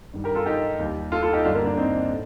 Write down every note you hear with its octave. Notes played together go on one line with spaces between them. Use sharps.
G2 D#3 G3
G4 A#4
F4 A4
D#4 G4
D#2 D#3 G3
F4 A4
F4 A4
D#4 G4
G2 D3 G3 D4 F4
A#3
A#3 D4
C4 D#4
A2